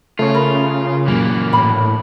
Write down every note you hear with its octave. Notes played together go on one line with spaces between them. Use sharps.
C#3 A3 F4 C#5
A#4 B5
F#2 A#2 E3 A#3
A2 D4 B5